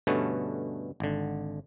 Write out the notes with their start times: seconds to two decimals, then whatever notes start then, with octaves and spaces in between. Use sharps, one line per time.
0.07 G2 B2 D3 A3 B3 C#4
1.00 G#1 D3